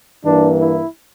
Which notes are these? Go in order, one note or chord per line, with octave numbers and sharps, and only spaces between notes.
G2 E3 A#3 D4
E4